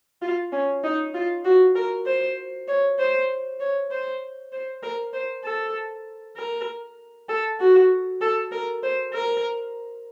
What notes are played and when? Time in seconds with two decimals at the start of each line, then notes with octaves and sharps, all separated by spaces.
0.22 F4
0.52 C#4
0.84 D#4
1.14 F4
1.45 F#4
1.76 A#4
2.06 C5
2.68 C#5
2.99 C5
3.60 C#5
3.91 C5
4.53 C5
4.83 A#4
5.13 C5
5.44 A4
6.37 A#4
7.29 A4
7.60 F#4
8.21 A4
8.52 A#4
8.83 C5
9.13 A#4